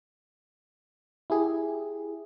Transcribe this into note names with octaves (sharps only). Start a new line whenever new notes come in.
E4 G4 G#4